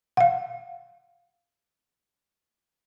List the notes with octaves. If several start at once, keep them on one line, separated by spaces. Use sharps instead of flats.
F5 F#5